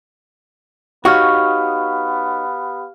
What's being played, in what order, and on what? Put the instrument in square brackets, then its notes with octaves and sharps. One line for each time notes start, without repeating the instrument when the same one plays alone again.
[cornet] B3 [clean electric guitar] D#4 C#5 [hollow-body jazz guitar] F#4 [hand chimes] G4 F5 F6